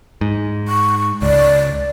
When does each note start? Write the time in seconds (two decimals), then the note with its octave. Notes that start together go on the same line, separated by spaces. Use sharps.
0.21 G#2
0.68 C#6
1.22 C#2 D5